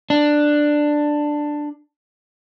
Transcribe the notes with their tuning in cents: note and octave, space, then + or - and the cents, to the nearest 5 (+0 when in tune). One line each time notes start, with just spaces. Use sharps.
D4 +10